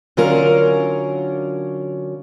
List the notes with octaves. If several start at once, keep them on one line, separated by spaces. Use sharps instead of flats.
D3 F#3 C#4 F4 A#4